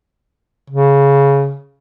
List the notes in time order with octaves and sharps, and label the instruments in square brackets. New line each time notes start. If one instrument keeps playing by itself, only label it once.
[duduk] C#3